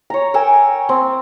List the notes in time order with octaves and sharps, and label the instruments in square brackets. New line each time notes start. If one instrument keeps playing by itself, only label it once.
[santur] C#5 A#5
A#4 G5 G#5 E6
C4